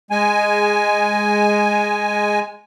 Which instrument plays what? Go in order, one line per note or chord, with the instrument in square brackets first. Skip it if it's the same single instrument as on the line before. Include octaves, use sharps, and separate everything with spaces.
[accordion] G#3 G#5